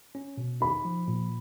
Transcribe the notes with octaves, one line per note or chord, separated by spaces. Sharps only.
C#4
B2
D#4 B5
F3
A#2